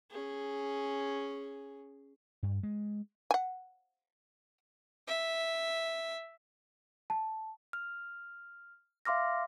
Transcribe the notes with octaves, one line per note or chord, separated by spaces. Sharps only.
C#4 G#4
G2
G#3
F#5 G#5
E5
A5
F6
E5 F5 C6 D6 F6 A#6